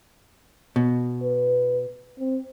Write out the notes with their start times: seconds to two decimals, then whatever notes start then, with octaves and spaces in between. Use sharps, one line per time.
0.76 B2
1.23 B4
2.19 C4